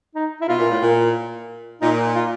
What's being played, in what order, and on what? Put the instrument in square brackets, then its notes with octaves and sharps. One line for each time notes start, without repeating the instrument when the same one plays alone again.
[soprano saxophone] D#4
E4
[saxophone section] B2 [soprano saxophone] F4
[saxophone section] A#2
A2
A#2
[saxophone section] A#2 [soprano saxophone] D#4
[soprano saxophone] F4